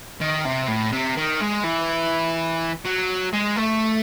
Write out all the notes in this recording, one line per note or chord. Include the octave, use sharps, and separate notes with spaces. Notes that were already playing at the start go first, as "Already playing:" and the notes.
D#3
C3
A2
C3
D#3
G#3
E3
F#3
G#3
A3